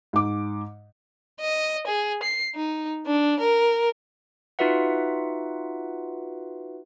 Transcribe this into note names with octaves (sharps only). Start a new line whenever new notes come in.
G#2 D6
D#5
G#4
C7
D#4
D4
A#4
D#4 F4 F#4 B4 E5 F#5